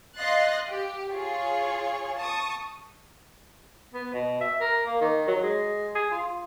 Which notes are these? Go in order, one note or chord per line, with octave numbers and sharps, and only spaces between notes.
D#5 F5 C6 F#6 A6 C7
G4
F4 G#4 C#5
A5 C#6 D#6
B3
B2
E5
A#4
A#3
D#3
F#3
G#3
G#4
F4